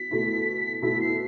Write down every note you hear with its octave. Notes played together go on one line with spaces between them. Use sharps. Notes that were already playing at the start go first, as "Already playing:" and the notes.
Already playing: B2 E4 B6
B2 A3 E4
B2 A3 E4 B6
C7